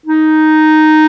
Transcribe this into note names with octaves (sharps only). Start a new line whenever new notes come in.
D#4